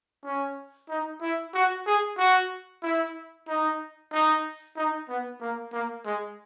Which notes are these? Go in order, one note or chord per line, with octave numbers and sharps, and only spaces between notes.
C#4
D#4
E4
F#4
G#4
F#4
E4
D#4
D#4
D#4
B3
A#3
A#3
G#3